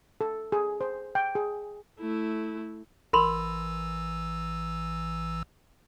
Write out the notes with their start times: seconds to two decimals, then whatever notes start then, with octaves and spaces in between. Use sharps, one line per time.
0.21 A4
0.52 G#4
0.81 C5
1.15 G5
1.35 G#4
1.99 A3 E4
3.13 A1 E3 A#4 B5 C6 E6